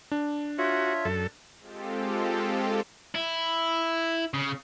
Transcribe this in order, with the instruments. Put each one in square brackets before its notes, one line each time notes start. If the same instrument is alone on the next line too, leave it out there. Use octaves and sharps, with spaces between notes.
[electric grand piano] D4
[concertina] F4 C#5 E5 [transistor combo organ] F#4
[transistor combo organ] F#2 A4
[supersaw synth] G#3 C4 F4 G4 A4
[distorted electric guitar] E4
C#3